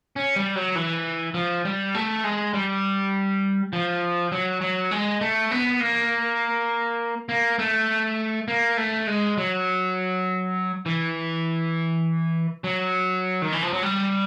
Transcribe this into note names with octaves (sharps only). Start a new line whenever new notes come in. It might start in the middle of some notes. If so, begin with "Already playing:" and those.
C#4
G3
F#3
E3
F3
G3
A3
G#3
G3
F3
F#3
F#3
G#3
A3
B3
A#3
A#3
A3
A#3
A3
G#3
F#3
E3
F#3
D#3
E3
F3
F#3
G3